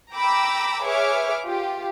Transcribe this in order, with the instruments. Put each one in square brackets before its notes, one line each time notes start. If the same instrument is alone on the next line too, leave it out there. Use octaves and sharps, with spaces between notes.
[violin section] G5 A#5 B5 D6 E6
G#4 B4 C#5 E5 D6 F6
F4 G4